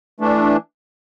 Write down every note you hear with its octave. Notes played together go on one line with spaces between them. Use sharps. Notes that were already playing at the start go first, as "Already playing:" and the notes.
E3 A3 D4